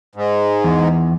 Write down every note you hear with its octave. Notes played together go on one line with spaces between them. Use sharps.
G#2
E2